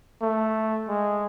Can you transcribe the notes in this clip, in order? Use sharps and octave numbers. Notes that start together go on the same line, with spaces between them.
A3
G#3